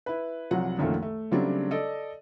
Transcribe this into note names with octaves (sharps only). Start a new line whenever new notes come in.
E4 B4
C2 F3 F#3 F#5
C2 F#2 D#3 F3 A3 A#3
A3
C#3 F#3 G3 A3 C4 D4
A4 D5 D#5